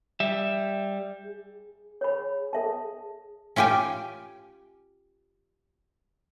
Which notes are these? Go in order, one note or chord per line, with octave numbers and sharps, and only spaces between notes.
G3 E5
G#4
C#5 B5
A4 E5 A5
C#4 F4 G4 G5 G#5